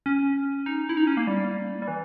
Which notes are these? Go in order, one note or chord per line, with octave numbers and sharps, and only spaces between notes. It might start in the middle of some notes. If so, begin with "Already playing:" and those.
C#4
D#4
E4
D#4
C#4
A#3
G3
G3
E3